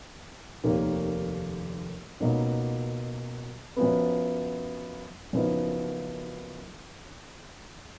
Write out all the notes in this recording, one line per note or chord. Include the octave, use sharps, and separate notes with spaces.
F1 D#2 D#3 A#3
C#2 B2 F#3 A#3 D#4
F#2 F3 B3
F#1 F#2 F3 B3 D#4